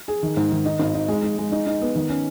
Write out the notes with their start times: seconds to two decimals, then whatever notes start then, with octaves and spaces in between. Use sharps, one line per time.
0.08 G#4
0.23 D#3
0.37 G#2
0.52 D#3
0.65 D#4
0.79 G#1
0.94 D#4
1.08 G#3
1.23 G#3
1.38 G#3
1.52 D#4
1.67 D#4
1.82 B3
1.95 D#3
2.10 C#4